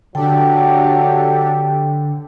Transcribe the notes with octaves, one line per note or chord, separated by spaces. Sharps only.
D3 F#3 D4 G4 A4 G5